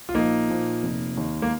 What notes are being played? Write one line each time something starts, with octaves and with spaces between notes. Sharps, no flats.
F4
A#1 A#3 D#4
A#2 F3
F1
D#2 D#3
A#3